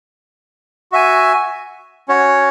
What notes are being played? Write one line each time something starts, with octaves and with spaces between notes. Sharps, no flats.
F#4 E5 G#5
C#4 F#4 C#5